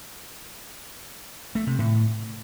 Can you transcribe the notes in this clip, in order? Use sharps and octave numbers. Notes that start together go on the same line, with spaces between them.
A3
C3
A2